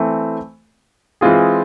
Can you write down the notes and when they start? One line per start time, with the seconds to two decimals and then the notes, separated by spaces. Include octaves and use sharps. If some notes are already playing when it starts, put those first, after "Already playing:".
Already playing: E3 A3 C4
1.21 E3 G#3 C4 F4 G#4